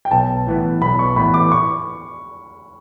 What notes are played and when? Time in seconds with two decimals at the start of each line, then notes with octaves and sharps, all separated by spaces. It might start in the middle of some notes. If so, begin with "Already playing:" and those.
0.05 G5
0.11 B1 A5
0.47 A2 E3 B3
0.82 B1 B5
0.99 C#6
1.16 A2 E3 B3 B5
1.34 D6
1.52 C#6